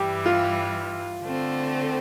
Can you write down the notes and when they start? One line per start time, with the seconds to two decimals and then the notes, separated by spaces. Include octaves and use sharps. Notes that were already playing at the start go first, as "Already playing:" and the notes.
Already playing: G2 E3 G3 G4
0.26 F4
1.23 D3 A3 C4